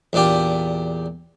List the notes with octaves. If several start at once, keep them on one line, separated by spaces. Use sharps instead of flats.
E2 A#2 D4 G4